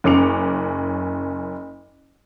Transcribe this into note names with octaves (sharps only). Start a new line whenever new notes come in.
F#1 C#4 D6 C#7 F7